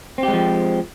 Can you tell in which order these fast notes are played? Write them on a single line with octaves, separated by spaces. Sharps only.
C4 G4 G#3 F3